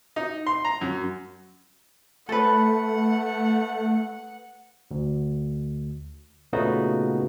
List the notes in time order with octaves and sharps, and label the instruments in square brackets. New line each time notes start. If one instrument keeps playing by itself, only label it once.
[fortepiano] D#4
C6
A#5
F#2
[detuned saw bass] A3 [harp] A4 B4 [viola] F#5
[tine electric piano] D2
A#2 C#3 A3 B3 D#4 F#4